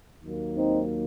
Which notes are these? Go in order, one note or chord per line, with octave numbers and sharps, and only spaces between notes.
D#2 D#3 F#3 A#3
C4 D#4